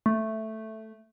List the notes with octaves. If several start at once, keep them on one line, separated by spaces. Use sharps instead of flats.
A3